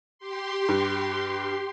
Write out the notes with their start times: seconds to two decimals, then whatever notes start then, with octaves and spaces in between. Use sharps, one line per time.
0.19 G4 C6
0.68 G2